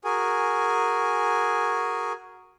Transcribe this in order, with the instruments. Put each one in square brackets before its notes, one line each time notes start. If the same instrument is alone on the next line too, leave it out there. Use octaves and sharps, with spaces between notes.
[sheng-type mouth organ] F#4 G#4 A#4 G#5